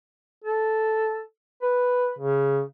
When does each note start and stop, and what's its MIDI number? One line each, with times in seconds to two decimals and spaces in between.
0.44 1.22 69
1.62 2.11 71
2.19 2.61 49